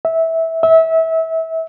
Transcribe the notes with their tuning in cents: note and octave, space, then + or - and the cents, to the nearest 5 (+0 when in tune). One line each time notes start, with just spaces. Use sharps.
E5 -15
E5 -25